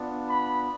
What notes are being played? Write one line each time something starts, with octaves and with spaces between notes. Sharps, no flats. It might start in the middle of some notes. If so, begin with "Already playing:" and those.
Already playing: B3 D4 F4
B5